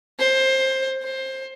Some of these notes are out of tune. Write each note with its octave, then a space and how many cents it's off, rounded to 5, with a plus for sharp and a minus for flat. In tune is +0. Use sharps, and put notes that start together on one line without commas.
C5 +20
C5 +20